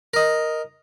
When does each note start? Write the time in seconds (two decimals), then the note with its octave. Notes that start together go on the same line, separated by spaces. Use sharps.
0.14 A#4 D#5